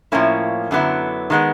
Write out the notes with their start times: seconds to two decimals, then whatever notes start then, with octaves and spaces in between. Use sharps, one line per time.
0.12 A2 F3 A#3 C#4 E4
0.71 F#2 D3 F#3 B3 E4
1.30 D#3 G#3 B3